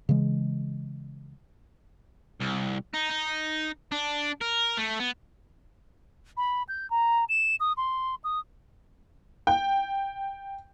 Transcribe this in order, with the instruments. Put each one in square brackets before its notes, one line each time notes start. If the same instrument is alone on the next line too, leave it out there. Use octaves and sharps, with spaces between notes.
[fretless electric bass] C#3 E3 G#3
[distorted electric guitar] C2
D#4
D#4
D4
A#4
A3
B3
[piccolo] B5
G6
A#5
E7
D#6
C6
D#6
[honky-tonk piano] G5